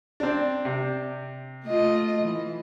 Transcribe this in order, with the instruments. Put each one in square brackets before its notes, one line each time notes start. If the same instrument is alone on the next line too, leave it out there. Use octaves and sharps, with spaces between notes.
[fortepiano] C4 D4
C3
[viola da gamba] A3 F4 D#5
E3